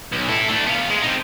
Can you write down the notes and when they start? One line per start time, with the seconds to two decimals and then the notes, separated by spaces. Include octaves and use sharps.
0.12 B1
0.29 E4 A4
0.49 A3 D4
0.67 B3 F5
0.90 G#3
1.02 C4 D#4